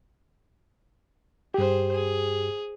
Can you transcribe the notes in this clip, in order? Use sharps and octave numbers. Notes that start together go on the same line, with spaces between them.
G2 G4 G#4 C5
G#4